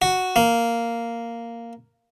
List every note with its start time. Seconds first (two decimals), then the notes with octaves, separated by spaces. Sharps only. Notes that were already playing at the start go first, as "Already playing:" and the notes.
0.02 F#4
0.36 A#3